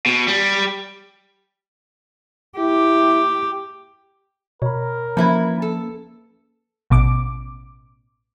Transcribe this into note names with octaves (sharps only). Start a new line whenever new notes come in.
B2
G3
E4 G4
B2 A#4 C#5 B5
E3 F3 A#3 C#4 E4 B4
A4
A1 B2 D6